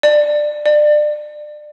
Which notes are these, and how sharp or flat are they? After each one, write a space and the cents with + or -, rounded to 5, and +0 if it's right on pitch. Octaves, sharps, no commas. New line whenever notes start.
D5 +15
D5 +25